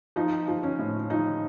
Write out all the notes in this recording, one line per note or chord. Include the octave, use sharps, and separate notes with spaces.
F3 D#4
F3
C#4
A2
F3 D#4